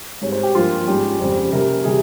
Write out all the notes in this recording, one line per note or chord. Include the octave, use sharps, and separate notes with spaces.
G#2 G3 C4 C#5
C5
G4
G2 F3 A#3 F4
G#2 G3 C#4 G4
F2 C#3 G3 C4
C3 G3 A#3 C#4 A#4
C3 E3 G3 G#4